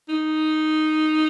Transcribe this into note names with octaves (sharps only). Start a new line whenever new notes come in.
D#4